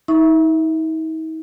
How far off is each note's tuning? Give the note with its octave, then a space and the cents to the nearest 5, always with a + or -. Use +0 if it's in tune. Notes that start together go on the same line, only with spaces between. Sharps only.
D#4 +40 E5 +0 C#6 +0